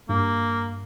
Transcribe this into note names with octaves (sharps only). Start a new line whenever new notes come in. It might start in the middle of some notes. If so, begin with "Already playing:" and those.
G2 A#3